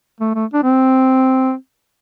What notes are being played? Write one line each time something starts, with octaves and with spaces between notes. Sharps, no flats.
A3
A3
D4
C4